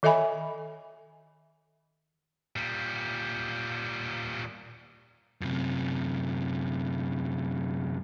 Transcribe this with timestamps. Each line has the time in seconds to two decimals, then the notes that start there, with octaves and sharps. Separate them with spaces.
0.03 D#3 A4 D#5 E5 G#5 B5
2.56 A#2 G3
5.41 F#2 C3